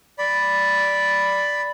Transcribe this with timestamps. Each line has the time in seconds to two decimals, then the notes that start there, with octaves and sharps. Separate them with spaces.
0.18 D5 B5